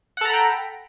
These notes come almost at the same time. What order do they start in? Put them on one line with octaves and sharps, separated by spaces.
F#5 A4 A#5 B5 G5